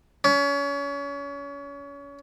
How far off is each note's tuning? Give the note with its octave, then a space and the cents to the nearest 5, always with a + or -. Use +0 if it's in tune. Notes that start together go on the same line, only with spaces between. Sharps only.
C#4 +30